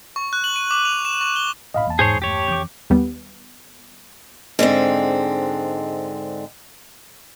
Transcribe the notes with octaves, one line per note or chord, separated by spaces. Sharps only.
C#6
F#6
F#7
D#7
D6
F7
E7
C#6
G7
A2 C#4 D#5 F5 B5
E2 A#3 A5
G#2 G#4 C5 C#5
G2 A3 G4 C#5
F2 E3 D6 G6
D#2 G3 B3
G#2 D3 G#3 C4